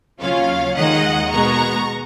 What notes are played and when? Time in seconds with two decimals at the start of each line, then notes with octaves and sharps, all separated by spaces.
0.20 D#2 C#3 F#3 C#4 F4 C#5 F5
0.75 D#2 D#3 G#3 D#5 F#5
1.31 B2 G#3 B3 A#5 C#6